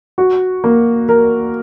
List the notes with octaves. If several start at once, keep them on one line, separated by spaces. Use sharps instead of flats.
F#4
A#3
A#4